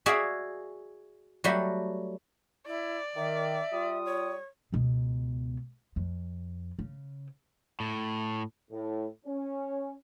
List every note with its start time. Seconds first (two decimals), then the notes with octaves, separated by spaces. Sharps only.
0.06 F#4 G#4 D5 E5 F5
1.44 F#3 G3 A3 F#4 G4
2.66 E4 D5
3.15 D#3 E5
3.71 G3 F4 D#6
4.05 C#5
4.72 C#2 B2
5.96 F2
6.79 C#3
7.80 A2
8.71 A2
9.26 C#4